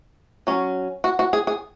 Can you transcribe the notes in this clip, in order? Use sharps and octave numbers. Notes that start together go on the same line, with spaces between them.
F#3 C#4
F#4
F#4
G#4
G#4